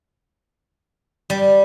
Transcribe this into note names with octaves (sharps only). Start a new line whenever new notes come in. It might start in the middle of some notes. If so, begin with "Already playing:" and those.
G3